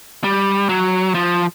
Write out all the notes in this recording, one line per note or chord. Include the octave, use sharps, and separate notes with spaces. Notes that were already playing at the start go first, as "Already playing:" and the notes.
G3
F#3
F3